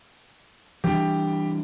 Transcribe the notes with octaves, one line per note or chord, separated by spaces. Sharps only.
E3 G3 D4 G4 G5